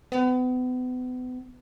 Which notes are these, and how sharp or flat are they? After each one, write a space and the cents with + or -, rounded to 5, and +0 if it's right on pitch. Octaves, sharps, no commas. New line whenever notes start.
B3 +35